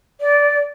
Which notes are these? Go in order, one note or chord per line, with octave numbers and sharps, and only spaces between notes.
D5